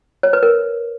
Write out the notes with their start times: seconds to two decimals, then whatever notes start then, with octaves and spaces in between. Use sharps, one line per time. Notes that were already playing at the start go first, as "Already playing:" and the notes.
0.23 C#5
0.33 B4
0.43 A#4